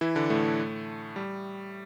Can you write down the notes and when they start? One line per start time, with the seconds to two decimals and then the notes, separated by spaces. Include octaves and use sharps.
0.01 E3 E4
0.15 D3 D4
0.30 A2 A3
1.16 G3